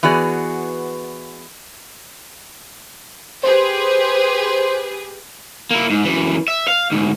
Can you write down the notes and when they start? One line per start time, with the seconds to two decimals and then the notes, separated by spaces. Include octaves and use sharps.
0.03 E3 B3 F#4 G#4 D5
3.43 G4 G#4 B4 C5
5.71 A#3 E4
5.90 G#2
6.05 F#2 E3
6.48 E5
6.68 F5
6.92 D2 G#2